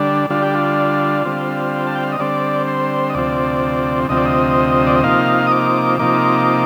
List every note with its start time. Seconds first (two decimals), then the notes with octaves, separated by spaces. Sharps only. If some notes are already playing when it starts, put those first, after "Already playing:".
Already playing: D3 G3 D4
0.30 D3 G3 D4 F4
0.42 G4
0.55 F4
1.25 D3 G3 C4
1.87 A5
1.95 G5
2.03 F5
2.12 D#5
2.20 D3 G3 C4 D5
2.68 C5
3.10 D#5
3.14 D2 C3 F3 C4 D5
4.09 D2 C3 F3 C4 D#5
4.17 D5
4.26 D#5
4.87 D5
4.96 D#5
5.04 C3 F3 A#3 D#4 F5
5.47 D#6
5.51 D6
5.99 C3 F3 A#3 D#4 D6